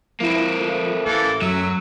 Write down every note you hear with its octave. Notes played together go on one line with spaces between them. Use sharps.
F3 A#3 C4 E4
A3
A1 E3 A#3 A4
F#2 F#3 E5